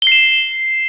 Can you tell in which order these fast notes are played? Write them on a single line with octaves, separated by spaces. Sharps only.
G7 C7 E7